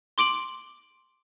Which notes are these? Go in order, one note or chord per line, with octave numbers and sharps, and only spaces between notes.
C6 D6 D7 F#7